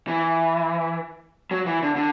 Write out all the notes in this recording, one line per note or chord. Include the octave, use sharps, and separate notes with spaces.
E3
F#3
E3
D3
D3